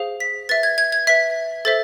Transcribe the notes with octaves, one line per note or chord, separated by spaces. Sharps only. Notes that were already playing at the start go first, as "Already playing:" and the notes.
Already playing: G#4 C5 F5
B6
B4 E5 A6
G#6
G#6
G#6
B4 E5 B6
A4 C5 E5 A6